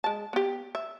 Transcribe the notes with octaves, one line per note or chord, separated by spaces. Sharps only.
G#3 A5
B3 G4
E5